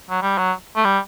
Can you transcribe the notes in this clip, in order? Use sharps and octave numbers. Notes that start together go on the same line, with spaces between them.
F#3
G3
F#3
A3
G3